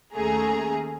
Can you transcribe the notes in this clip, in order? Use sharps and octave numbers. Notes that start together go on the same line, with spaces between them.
D#2 A3 C#4 G#4 A#5